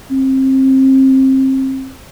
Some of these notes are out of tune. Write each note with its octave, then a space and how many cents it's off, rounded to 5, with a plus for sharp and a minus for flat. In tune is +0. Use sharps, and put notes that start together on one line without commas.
C4 +25